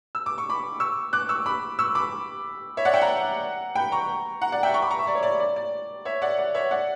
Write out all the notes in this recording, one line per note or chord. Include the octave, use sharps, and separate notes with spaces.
E6
D6
C#6
B5 D6
C#6 E6
D6 F#6
C#6 E6
B5 D6
C#6 E6
B5 D6
C#5 E5
D5 F#5
E5 G5
F#5 A#5
G5 B5
A#5 C#6
F#5 A#5
D5 F#5
E5 G5
A#5 C#6
B5 D6
A#5 C#6
E5
D5
C#5
D5
D5
D5
C#5 E5
D5 F#5
D5
C#5 E5
D5 F#5